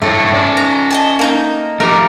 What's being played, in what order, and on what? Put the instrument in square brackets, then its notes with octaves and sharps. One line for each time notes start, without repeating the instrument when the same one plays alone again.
[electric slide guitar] G2 A4 C#5 [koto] A3
[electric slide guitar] C#4 D5
[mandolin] A#5
D#5 G#5 A5
A#3 D#4 G6
[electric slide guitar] A3 G4 [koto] A#4